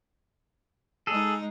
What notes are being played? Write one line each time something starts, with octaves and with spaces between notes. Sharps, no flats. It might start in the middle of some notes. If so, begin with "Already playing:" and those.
G#3 D#4 G#4 A4